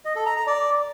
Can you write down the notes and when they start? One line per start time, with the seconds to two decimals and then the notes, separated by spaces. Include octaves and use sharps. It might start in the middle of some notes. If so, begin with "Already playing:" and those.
0.05 D#5
0.16 A4
0.26 A#5
0.37 A#5
0.47 D5